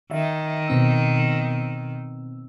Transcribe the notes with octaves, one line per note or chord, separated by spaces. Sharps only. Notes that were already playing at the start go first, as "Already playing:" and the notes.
D#3 E5
B2 C4 E6